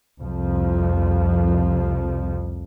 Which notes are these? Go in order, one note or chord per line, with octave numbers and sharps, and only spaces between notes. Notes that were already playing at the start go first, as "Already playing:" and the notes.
C2 F2 F3